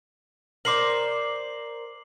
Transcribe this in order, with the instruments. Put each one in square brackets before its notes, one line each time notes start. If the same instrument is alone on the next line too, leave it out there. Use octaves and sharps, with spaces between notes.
[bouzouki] A#4 C5 D5 [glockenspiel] D6 C7 F#7